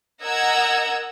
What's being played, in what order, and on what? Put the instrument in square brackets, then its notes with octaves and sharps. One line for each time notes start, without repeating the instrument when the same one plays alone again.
[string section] A#4 D#5 F#5 A#5 E6 G#6